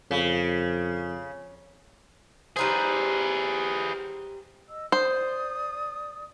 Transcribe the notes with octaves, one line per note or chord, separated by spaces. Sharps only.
F2 C#3
G3 D#4 G#4 B4 C5
D#5 E6
C5 D5 D#6